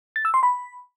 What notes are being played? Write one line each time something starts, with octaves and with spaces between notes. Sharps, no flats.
A6
E6
C6
B5